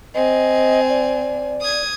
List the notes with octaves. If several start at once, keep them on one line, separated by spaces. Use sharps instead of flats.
C4 D#5 G#5
D5
D#6 G#6